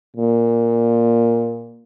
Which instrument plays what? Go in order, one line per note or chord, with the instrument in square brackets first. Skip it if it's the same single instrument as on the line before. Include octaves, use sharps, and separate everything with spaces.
[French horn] A#2